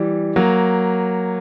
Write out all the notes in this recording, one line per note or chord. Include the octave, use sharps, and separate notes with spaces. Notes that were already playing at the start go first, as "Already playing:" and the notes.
Already playing: E3 G3
F#3 A#3